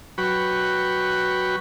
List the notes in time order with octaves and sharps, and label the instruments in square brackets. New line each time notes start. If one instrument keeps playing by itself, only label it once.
[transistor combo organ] F#3 F#4 B4 G5 B5 C#6